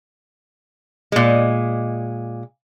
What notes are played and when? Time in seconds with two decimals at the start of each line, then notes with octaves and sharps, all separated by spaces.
1.12 A#2 G#3